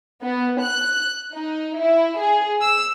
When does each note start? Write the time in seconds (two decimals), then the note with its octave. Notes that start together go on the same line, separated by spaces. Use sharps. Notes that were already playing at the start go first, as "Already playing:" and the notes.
0.22 B3
0.60 F#6
1.34 D#4
1.77 E4
2.19 G#4
2.61 E6